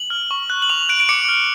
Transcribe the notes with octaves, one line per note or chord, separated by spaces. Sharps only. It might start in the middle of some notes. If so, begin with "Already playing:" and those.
Already playing: F#7
F6
C#6
F#6
F#7
C#6 F7
F#6 D7
D7
D6 C#7
F6